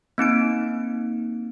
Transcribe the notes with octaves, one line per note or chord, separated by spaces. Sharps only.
A#3 C4 D#4 D7